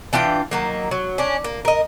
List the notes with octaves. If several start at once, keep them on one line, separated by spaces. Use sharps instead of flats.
E3 D4 F4 G5
D#3 F#3 A#3
F#3
C#4 D4
A#3
A#4 D#5